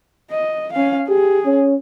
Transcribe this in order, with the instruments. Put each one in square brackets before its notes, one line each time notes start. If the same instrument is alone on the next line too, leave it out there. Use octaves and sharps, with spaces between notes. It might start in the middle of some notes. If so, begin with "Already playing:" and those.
[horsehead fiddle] D#5
C#4 F5
[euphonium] G4 [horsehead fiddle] G#4
[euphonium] C#4